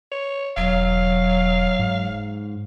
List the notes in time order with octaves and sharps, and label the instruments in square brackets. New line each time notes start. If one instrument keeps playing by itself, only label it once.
[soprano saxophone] C#5
[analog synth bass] E1 [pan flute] F#3 [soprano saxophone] F5
[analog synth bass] G#2